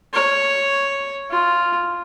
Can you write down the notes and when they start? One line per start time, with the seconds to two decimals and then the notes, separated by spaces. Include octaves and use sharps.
0.13 C#5
1.31 F4